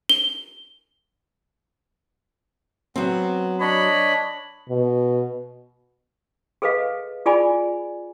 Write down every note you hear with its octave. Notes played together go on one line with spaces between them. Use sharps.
G7
F#3 B3 C4
D4 C#5 D#5 B5
B2
G#4 A4 B4 D#5 F5
F4 G#4 D5 G#5 B5